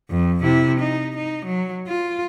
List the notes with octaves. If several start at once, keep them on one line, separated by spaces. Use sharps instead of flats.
F2
C3 E4
D#4
D#4
F#3
F4